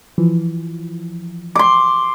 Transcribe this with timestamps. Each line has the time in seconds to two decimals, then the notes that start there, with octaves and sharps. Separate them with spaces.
0.18 E3 F3
1.55 C6 D6